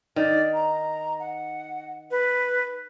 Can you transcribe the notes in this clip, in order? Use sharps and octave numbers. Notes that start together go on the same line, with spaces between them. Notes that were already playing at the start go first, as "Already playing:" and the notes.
D#3 D5
A#5
F#5
B4